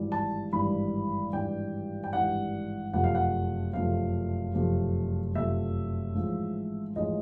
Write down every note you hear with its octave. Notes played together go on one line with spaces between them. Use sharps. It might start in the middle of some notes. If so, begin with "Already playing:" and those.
Already playing: G#1 G2 E3 G3
A5
G#1 G2 E3 G3 B5
G#1 G2 E3 G3 G5
G5
G#1 G2 E3 G3 F#5
F#1 F2 C3 F3 A3 F#5
F5
F#5
F#1 F2 C3 F3 A3 F5
F#1 F2 C3 F3 A3
F#1 F2 C3 F3 A3 E5
A1 G#2 F3 G#3
A1 G#2 F3 G#3 D#5